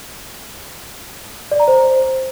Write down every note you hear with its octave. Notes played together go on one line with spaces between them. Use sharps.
D5
A#5
C5